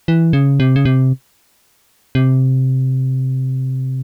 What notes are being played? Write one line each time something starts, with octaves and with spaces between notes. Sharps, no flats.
E3
C#3
C3
C#3
C3
C3